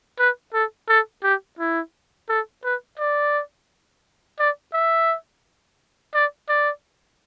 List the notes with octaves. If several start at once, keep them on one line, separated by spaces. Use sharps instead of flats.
B4
A4
A4
G4
E4
A4
B4
D5
D5
E5
D5
D5